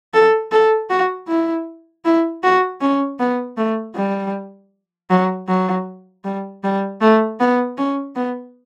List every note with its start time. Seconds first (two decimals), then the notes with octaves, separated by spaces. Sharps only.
0.14 A4
0.52 A4
0.90 F#4
1.28 E4
2.05 E4
2.43 F#4
2.81 C#4
3.20 B3
3.57 A3
3.95 G3
5.10 F#3
5.49 F#3
6.25 G3
6.64 G3
7.01 A3
7.40 B3
7.78 C#4
8.16 B3